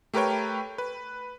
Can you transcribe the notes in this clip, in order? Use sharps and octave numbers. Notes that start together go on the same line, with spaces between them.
A3 G4 A#4 B4 C#5 G5
B4